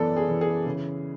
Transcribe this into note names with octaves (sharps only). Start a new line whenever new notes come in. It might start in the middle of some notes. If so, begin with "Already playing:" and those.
Already playing: F#2 E3 B3 A4 D5
G#4
E3
G#4
C#3